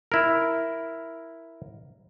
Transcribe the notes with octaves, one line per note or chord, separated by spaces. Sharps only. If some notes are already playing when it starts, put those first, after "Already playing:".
E4 A#4